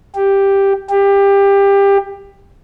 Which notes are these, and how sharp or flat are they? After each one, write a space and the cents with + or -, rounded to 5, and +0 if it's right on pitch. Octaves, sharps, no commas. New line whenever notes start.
G4 +5
G4 +20